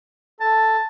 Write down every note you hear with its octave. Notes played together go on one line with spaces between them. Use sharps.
A4 A5